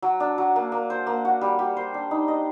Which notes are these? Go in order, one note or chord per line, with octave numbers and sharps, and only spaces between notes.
F#3
D4
F#3
A#3
A#3
C5
A#3
F#4
G3
G4
C5
D4
D#4
D#5